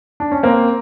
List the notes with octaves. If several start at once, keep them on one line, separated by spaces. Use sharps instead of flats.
D4
C#4
A#3 C4